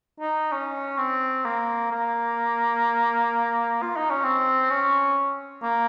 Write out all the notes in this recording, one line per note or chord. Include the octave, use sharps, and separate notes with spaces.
D#4
C#4
C4
A#3
A#3
F4
D#4
C#4
C4
C#4
A#3